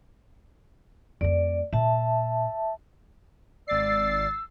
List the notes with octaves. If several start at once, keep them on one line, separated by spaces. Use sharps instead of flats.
F2 A3 D5
A#2 E5 A5
G#1 D5 E6 A6 C7